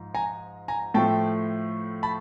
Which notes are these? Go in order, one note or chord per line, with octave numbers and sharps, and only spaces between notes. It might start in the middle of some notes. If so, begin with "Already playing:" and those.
Already playing: G#2 F3
G#5 A#5
G#5 A#5
A2 F3 A3 G5 A5
A5 B5